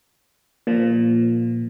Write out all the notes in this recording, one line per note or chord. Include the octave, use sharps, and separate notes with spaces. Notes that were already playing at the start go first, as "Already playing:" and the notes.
A#2 F3